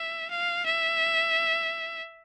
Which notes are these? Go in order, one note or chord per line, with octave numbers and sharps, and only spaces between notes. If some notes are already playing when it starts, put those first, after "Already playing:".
Already playing: E5
F5
E5